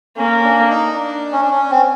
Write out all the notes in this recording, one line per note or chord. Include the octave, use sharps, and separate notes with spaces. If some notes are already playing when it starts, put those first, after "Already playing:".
A#3 C#4
D4
D#4
D4
C#4
D4
C#4
C4